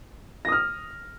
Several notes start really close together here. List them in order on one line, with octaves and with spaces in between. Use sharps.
A#6 D#6 F6